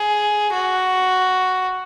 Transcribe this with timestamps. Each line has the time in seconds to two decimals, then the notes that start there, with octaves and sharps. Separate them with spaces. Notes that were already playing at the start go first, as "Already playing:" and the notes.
Already playing: G#4
0.53 F#4